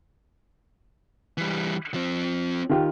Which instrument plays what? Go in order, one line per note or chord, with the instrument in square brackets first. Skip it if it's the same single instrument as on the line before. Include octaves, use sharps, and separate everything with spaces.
[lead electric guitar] E3 G3
F3 C4
[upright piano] D#3 F4 G4